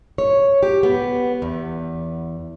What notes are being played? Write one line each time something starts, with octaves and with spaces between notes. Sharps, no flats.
C#5
G4
B3
E2